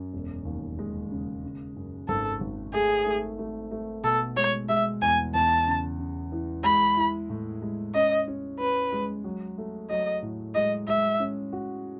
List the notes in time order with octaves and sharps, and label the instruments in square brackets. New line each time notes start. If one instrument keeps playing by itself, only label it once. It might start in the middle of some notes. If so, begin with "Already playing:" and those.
Already playing: [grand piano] F#2
E1
D#2
G#3
C#3
C#3
F#2
[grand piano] G#1 [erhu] A4
[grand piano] G#1
[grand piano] A3 [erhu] G#4
[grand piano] A3
A3
A3
[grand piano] B2 [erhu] A4
[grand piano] G#3 [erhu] C#5
[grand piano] G#3 [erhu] E5
[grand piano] E2 [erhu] G#5
[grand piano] E2 [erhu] A5
[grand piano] C#3
C#3
E3
[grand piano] G#3 [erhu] B5
[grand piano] E4
A2
G#3
[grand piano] C#4 [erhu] D#5
[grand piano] C#4
[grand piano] C#4 [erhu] B4
[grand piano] G#3
F#3
A3
[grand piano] F#3 [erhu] D#5
[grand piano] A2
[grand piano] G#3 [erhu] D#5
[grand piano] G#3 [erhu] E5
[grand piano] C#4
F#4